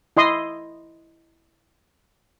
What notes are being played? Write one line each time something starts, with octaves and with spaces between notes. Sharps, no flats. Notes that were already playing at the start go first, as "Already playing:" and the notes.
E4 D#5 C6 D#6